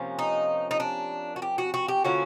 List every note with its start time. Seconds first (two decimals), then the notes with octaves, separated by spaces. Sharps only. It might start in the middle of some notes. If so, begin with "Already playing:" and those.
Already playing: C3 F3 A#3 C#4
0.19 D#4
0.71 D#4
0.80 D4
1.36 F#4
1.42 G4
1.58 F#4
1.74 F#4
1.88 G4
2.04 D3 F3 A#3 C#4 F#4